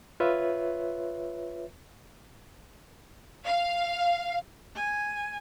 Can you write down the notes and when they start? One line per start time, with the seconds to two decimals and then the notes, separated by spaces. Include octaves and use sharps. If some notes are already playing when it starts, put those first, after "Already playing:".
0.20 F4 B4 C#5 E5
3.45 F5
4.75 G#5